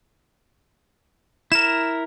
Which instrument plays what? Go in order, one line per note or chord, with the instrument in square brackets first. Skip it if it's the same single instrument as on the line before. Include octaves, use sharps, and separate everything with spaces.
[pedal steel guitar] E4 A#4 [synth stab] E7